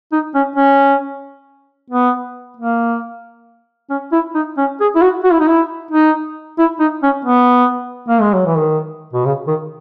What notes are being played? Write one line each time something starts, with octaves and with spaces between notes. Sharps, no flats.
D#4
C#4
C#4
B3
A#3
C#4
E4
D#4
C#4
G#4
E4
F#4
F#4
E4
D#4
E4
D#4
E4
D#4
C#4
B3
A#3
G#3
F#3
E3
D#3
B2
C#3
D#3